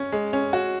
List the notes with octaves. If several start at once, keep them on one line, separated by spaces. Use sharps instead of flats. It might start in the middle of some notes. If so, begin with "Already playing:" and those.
Already playing: C#4
G#3
C#4
F#4